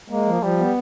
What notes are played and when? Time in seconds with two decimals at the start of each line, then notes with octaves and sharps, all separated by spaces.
0.10 G#3 A#3
0.26 F3
0.42 F3 G3
0.59 B3